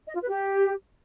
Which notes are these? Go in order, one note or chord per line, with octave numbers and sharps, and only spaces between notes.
D#5
F4
B4
G4